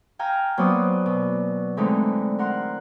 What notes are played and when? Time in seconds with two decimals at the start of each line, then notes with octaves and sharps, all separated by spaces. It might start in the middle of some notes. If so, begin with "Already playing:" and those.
0.19 F5 G5 G#5 A#5 F6
0.58 F#3 A#3 B3 C5 D5 D#6
1.06 B2
1.77 D3 E3 G#3 A3 C4 D#4
2.39 A#4 F#5 C6